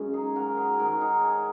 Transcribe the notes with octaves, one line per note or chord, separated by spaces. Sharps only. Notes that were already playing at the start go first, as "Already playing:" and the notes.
Already playing: F#2 C#3 G#3 C#5
D#4 G#4
F#4 A#4
G#4 C#5
G#4
G#2 D#3 G#3 F#4 A#4
D#4 G#4
G#4 C#5